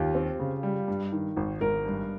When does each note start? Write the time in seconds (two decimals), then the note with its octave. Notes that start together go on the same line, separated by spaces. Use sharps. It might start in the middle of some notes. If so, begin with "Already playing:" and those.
Already playing: D#2 F4 G4
0.15 C4
0.40 C#3
0.63 G3
0.88 G2
1.12 D#3
1.37 G#1
1.61 G#1 A#4
1.86 G2